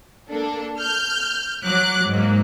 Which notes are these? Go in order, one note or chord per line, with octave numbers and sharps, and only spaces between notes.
A#3 D4 A4
F6 G6
F#3 D6 F#6
G#2 F#3 A#3